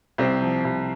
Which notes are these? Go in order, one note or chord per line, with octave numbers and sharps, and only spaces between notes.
C2 C4
F3
C2